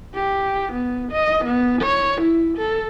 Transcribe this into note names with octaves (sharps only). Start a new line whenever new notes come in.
G4
B3
D#5
B3
C#5
E4
A4